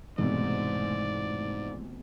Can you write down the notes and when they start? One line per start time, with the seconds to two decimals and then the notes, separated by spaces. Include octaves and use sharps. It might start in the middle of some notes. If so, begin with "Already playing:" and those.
0.18 F1 B1 F2 G#2 E3 G#3 A3 D5